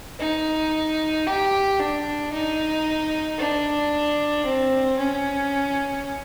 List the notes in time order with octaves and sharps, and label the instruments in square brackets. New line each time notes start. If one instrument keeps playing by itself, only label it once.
[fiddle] D#4
G4
D4
D#4
D4
C4
C#4